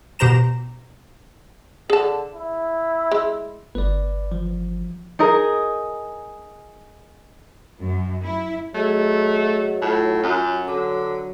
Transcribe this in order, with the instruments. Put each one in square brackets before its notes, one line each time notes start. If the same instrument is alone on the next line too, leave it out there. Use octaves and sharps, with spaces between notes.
[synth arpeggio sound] B2 G4 C5 A#5 E7
[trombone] D3 [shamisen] G#4 A5
[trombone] E4
[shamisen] G#3
[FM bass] G1 [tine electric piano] B4 D5
[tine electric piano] F3
[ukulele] D#4 G#4 A#4
[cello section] F#2
E4
[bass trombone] F#3 [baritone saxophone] A3 [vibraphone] G#4 D#5 E6
[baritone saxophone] A2 [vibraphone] F4
[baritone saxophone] F#2
[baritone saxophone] D3 [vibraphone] D6